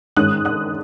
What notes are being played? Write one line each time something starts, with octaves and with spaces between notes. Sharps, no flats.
G#2 D#3 G#3 C#4 D#6 F#6
D#6 F#6